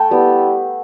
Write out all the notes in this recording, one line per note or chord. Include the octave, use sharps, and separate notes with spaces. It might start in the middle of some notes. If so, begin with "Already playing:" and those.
Already playing: A3 G5 A5 B5
G3 B3 E4